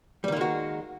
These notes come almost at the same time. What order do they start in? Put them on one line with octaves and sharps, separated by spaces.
G3 D#3 A#3 G#3 F#4